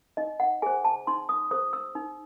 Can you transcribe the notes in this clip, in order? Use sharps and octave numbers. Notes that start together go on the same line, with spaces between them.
D#4 D#5
F#5
G#4 C5 G#5
A5
D#4 C6
D#6
G#4 C5 D#6
E6
D#4